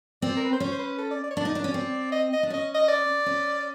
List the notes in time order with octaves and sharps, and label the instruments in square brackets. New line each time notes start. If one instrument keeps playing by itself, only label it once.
[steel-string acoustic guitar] C4 [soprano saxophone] D5
[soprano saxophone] A#4
B4
C5
[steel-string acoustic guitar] C#4 [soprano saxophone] C#5
[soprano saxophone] C5
B4
A4
D5
D5
C#5
[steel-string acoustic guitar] D4 [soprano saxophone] D5
[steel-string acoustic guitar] D#4
D4
C#4
C4
[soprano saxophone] D#5
D#5
[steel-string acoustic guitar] D4
[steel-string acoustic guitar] C#4 [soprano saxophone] D#5
[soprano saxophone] D#5
D5
[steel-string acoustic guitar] C#4